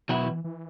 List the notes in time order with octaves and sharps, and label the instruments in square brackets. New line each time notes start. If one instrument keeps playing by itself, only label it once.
[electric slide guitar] B2 F#3 B3 E4 [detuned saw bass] D#3
[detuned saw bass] E3
E3